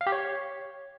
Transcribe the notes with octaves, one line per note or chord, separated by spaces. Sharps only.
F5
G4
C#5